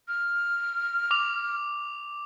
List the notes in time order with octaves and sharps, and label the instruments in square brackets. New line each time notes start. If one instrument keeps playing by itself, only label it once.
[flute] F6
[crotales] D6 F7